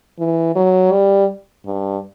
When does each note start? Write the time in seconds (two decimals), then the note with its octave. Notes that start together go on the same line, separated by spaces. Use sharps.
0.19 E3
0.56 F#3
0.92 G3
1.65 G2